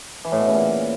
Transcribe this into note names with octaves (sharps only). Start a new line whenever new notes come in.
E3
A2
B2
C#3
A#2